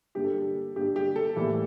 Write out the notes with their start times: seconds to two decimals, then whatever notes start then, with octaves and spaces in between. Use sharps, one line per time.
0.15 G2 D3 G3 A#3 G4
0.24 A4
0.34 G4
0.76 G2 D3 G3 A#3 G4
0.96 G4
1.16 A4
1.36 A2 E3 G3 A#3